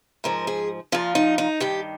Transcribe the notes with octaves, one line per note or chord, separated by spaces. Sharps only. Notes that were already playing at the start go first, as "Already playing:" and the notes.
G#2 F3 A#4
G#4
A#2 F3 F4
D#4
D#4
G2 D#3 G4